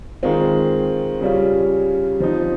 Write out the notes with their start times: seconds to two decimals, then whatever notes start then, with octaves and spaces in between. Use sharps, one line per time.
0.23 D#3 G#3 C4 F4
1.21 C#3 G3 C#4 F4
2.20 F3 C4 D#4